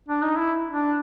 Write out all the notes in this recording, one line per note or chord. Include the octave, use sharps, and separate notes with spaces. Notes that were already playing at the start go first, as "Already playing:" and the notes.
D4
D#4
E4
D4